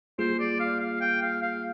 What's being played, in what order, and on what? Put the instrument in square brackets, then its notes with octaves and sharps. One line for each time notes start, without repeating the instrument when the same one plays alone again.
[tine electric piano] G3 A#3 F4 G#4 [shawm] C5
[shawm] D5
F5
F5
G5
F5
F5